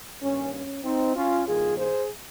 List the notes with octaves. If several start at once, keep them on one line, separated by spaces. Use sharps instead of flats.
G2 D#3 A#3 C#4
C#4
C4 D#4
C#4 F4
G2 D#3 A#3 F4 G#4
G#4 C5